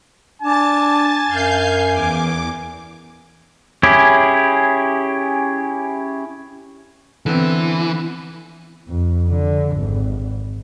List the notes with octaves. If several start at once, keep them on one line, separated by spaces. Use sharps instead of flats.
D4 G#5 A5 A6
F#2 F5 G6 C7
E2 D6
C#4 E4 G4 G#4
D3 E3 B3 C4
F2
D3
G#1